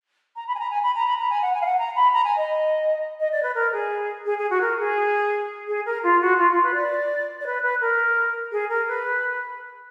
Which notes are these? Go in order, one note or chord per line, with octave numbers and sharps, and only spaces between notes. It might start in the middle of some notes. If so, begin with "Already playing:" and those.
A#5
B5
G#5
A#5
G#5
B5
A#5
B5
A#5
G#5
F#5
G#5
F5
F#5
A#5
B5
A#5
G#5
D#5
D#5
D5
B4
A#4
G#4
G#4
G#4
F#4
A#4
G#4
G#4
A#4
F4
F#4
F4
F4
B4
D5
D5
B4
B4
A#4
G#4
A#4
B4